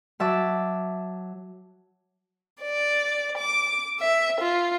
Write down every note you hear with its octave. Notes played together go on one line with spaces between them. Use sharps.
F#3 E5 A5 D6
D5
D6
E5
F4